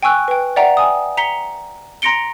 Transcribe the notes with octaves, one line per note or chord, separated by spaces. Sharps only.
G5 G#5 C#6 E6 F#6
B4 G5
D5 E5 F#5 G5 A#5
G#5 D#6
A#5 B6 C#7 G7
A#5 C6 A#6 C#7 D7 G7